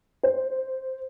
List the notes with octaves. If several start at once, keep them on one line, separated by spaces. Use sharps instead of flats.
C5